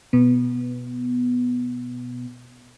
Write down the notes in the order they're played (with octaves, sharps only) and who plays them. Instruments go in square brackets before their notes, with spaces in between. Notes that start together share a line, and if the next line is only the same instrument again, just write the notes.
[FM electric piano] B2 B3